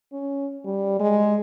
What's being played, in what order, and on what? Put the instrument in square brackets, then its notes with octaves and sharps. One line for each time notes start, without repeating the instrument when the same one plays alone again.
[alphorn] C#4
G3
G#3